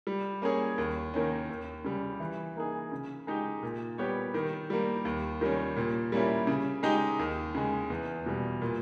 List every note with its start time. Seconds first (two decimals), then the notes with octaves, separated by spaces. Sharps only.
0.07 G3
0.42 A#3 C#4 G#4 C#5
0.78 D#2
1.14 D#3 A#3 C#4
1.49 D#2
1.85 C#3 G3
2.20 E3
2.56 A#3 D#4 G#4
2.92 C#3
3.27 G#3 D#4 G4
3.63 A#2
3.98 G3 B3 G4 C#5
4.34 D#3
4.70 G3 A#3
5.05 D#2
5.41 D#3 G3 C#4
5.77 A#2
6.12 G3 A#3 C#4 E4
6.47 C#3
6.83 G#3 D#4 G4
7.19 D#2
7.55 C#3 G#3
7.90 E2
8.26 B2 G3
8.62 A#2